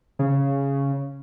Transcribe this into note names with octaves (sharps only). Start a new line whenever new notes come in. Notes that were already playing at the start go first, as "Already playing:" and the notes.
C#3